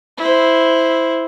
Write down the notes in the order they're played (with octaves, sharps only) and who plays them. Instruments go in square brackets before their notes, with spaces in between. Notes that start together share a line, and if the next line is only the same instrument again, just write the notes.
[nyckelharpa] E4 C5